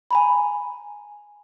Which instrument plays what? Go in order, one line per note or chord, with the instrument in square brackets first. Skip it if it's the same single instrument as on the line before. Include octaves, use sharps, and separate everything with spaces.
[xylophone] G#5 A#5 B5